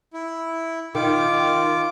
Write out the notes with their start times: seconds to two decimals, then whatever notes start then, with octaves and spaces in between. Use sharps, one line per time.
0.14 E4
0.95 D#3 F4 D6